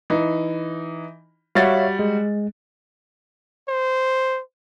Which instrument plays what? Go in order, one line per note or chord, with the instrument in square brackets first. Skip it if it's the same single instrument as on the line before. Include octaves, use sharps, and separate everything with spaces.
[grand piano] E3 D#4
[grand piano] G3 F#4 A6 [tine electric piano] C#5 E5 F5
[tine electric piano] G#3
[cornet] C5